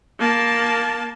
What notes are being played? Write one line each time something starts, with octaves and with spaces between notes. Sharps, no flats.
A#3 A5